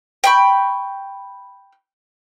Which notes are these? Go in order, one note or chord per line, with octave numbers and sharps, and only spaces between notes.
G5 B5 C#6